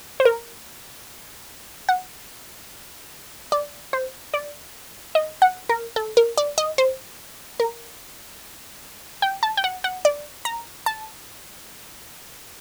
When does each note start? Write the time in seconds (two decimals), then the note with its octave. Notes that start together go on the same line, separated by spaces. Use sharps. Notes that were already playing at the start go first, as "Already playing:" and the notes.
0.20 C5
0.25 A#4
1.89 F#5
3.52 D5
3.93 C5
4.34 D5
5.15 D#5
5.42 F#5
5.69 A#4
5.96 A4
6.17 A#4
6.37 D5
6.58 D#5
6.78 C5
7.60 A#4
9.22 G5
9.43 A5
9.57 G5
9.64 F#5
9.84 F#5
10.05 D5
10.45 A#5
10.86 A5